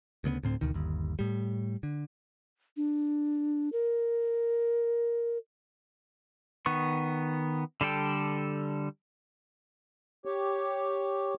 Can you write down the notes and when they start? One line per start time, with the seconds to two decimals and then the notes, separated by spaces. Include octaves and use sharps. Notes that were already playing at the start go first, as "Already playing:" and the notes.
0.24 D2 C#3 A#3 B3
0.43 D2 A2 C4
0.61 D2 B2 D#3
0.74 G1 D#2
1.19 A2 G3
1.83 D3
2.77 D4
3.72 A#4
6.66 D#3 B3 C#6
7.81 D3 G3 A4 G5
10.25 G4 C#5